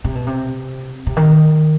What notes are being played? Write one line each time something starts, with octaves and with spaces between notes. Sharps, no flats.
C3
B2
C3
C3
D#3